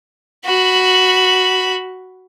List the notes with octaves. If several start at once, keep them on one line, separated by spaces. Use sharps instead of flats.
F#4 B5